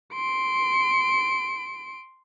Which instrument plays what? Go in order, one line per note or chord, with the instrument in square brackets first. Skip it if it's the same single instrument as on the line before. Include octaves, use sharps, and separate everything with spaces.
[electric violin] C6 D7